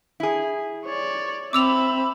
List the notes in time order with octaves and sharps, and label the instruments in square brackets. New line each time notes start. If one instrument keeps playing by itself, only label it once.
[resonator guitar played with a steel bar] E4 G#4
[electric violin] C#5 D5
[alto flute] C4 [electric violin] E5 B5 [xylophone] D6 E6 F7